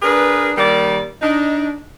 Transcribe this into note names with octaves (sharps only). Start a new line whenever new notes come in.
D4 G#4 A#4 B4
D#3 G3 A#3 D5
D4 D#4